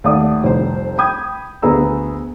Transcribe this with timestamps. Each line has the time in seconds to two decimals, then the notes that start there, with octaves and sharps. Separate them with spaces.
0.04 D#2 A3 D5 F#5 D#6
0.44 F1 C2 C5
0.98 G5 B5 D#6 G6 G#6
1.62 D2 B3 G#4 A#5 E6